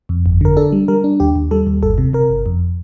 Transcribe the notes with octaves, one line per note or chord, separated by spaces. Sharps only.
F2
G1
D3 A#4
D4 A4
G3
G3 A#4
D4
D#2 G4
D#2
G3 A4
D#2
G1 A4
C3
C3 A#4
G1
F2